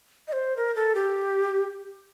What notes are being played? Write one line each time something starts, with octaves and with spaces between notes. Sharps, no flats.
D#5
C5
A#4
A4
G4